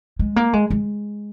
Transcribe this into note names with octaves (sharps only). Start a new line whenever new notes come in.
G#3
A#3
G#3
G#3